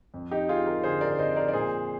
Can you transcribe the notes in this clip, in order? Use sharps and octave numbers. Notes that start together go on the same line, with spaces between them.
F2
D#4 G4
F3 F4 G#4
G4 A#4
D3 G#4 C5
A#4 D5
F2 C5 D#5
A#4 D5
D5
A#2 G#4 C5